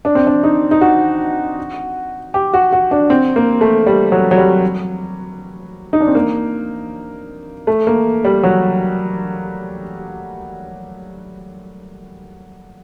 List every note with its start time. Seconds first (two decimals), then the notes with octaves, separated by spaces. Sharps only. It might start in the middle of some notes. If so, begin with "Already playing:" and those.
0.05 D4
0.15 C4
0.27 D4
0.43 D#4
0.71 D#4
0.81 F#4
2.34 G4
2.54 F#4
2.72 F#4
2.91 D4
3.10 C4
3.36 A#3
3.61 A3
3.86 G3
4.12 F#3
4.31 F#3
4.37 G3
5.93 D#4
6.00 D4
6.07 C4
6.15 A#3
7.67 A3
7.87 A#3
8.24 G3
8.43 F#3